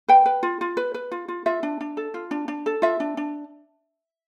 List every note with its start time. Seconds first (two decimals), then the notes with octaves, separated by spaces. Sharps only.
0.08 B4 G5
0.26 B4
0.43 F4
0.61 F4
0.77 B4
0.94 B4
1.12 F4
1.28 F4
1.46 F4 E5
1.63 D4
1.81 D4
1.97 A4
2.14 F4
2.31 D4
2.48 D4
2.66 A4
2.82 F4 E5
3.00 D4
3.17 D4